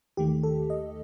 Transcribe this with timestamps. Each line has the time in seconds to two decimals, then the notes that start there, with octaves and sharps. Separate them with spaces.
0.17 D#2 D#3 A3 G4
0.43 A4
0.70 D#5